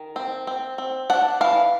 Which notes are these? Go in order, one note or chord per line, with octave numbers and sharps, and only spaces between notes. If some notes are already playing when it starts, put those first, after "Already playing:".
Already playing: D#3
C4
C4
C4
D4 F#5
E3 F5